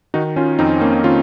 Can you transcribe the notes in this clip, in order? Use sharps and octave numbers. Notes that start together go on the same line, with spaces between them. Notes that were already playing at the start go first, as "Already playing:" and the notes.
D#3 D#4 F#4
C#4 F4
F2 C4 D#4
A#3 C#4
D#3 C#4 F4